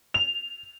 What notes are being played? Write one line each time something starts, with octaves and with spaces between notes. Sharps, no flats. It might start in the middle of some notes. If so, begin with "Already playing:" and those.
F7